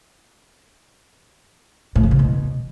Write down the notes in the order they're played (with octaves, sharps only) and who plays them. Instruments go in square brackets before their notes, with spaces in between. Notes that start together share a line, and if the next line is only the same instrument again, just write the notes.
[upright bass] A2
E2
C3
B2